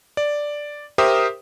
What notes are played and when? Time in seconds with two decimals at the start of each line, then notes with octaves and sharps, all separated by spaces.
0.17 D5
0.98 G4 A#4 C5 E5 D#6